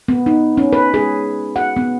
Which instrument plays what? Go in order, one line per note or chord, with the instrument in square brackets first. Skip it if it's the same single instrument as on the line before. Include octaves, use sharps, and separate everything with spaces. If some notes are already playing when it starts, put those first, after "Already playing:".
[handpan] B3
D#4
C#4
B4
G#4
F#5
B3